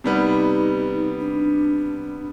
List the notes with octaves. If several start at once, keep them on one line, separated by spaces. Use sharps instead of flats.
C3 G3 B3 D#4
D4